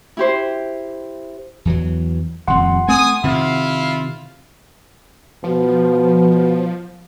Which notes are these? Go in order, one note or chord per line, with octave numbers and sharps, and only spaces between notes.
E4 G4 C5
E2 E3 F#3
D#1 F2 F#5 C6
A3 C4 G#5 D#6
C3 D#3 E4 F4 F5
B2 F3